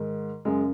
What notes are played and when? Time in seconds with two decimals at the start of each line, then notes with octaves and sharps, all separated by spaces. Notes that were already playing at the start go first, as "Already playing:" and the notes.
Already playing: G#2 D#3
0.45 F#2 C#3 G#3